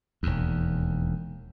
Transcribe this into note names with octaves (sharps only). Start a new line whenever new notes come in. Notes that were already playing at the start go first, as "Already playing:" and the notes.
E1 D#2